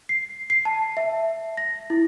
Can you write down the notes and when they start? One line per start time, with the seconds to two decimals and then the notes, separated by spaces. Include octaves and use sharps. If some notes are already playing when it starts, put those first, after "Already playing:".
0.09 C7
0.50 C7
0.65 A5
0.97 E5
1.57 A#6
1.90 E4